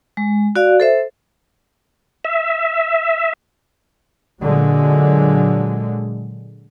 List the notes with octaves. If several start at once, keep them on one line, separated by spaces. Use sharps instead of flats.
G#3
F#4 D5 F5
A4 C5 E5
E5
A#2 D3 F#3 G#3